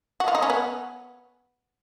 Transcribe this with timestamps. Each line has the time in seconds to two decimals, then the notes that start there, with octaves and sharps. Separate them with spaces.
0.20 F#4
0.28 F4
0.35 D#4
0.42 C#4
0.50 B3